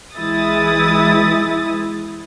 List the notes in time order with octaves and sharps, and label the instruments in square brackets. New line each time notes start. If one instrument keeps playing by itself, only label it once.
[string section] B1 E3 G#3 E4 D#6 A6